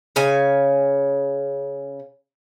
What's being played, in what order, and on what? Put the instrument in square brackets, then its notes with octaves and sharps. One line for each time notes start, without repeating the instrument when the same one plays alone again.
[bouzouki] C#3 C#5 G#5